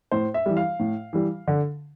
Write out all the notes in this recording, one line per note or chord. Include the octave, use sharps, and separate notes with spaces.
A2 C5
E5
E3 G3
F5
A2
E3 G3
D3